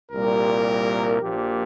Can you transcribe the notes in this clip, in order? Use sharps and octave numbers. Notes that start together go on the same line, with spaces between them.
C2 A#2 G3 A#4
A#1 A#2 F3 G4